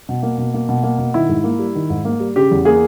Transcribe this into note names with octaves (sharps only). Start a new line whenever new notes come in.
B2
A#3
B2
A#3
B2
A#3
B2
D#3 E4
G#2
A#3
G3
D#3
G#2
A#3
G3
C#3 G4
E2
A#3 G#4